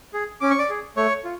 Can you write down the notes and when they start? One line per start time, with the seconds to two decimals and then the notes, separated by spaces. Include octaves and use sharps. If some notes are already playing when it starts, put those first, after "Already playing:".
0.14 G#4
0.41 C#4 D6
0.51 C#6
0.59 D5 D6
0.70 G#4
0.97 A3 C#5 C#6
1.25 F4